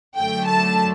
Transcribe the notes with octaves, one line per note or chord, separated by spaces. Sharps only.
F#2 D3 F#3 A3 G5
A5